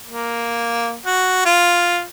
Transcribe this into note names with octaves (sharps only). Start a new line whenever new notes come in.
A#3
F#4
F4